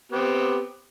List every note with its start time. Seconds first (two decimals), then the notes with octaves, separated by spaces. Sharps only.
0.12 B3 C4 G4